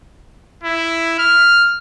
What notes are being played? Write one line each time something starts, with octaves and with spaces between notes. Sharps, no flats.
E4
F6